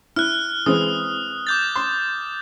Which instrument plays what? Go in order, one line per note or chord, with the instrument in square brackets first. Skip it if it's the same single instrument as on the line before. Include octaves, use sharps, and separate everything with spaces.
[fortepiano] E4 [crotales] F6 F#6
[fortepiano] E3 G#3 C4 [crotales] D#6
[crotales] D6 G6 A6
[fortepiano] C6